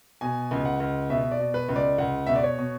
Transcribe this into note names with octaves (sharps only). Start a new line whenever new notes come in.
B2 G#5
C#2
F#5
C#2
B2 E5
D5
B2
B4
C#2
D5
C#2 F#5
B2 E5
D5
C#5
B2